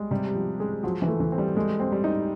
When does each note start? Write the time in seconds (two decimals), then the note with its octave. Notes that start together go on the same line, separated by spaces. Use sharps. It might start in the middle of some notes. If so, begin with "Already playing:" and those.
Already playing: G3 G#3
0.11 C3 G3
0.35 F3
0.60 G#3
0.83 F3 F#3
1.02 E3
1.08 A3
1.20 E3
1.32 C4
1.38 G3
1.56 G#3 A3
1.80 C4
1.92 G3
2.04 D#4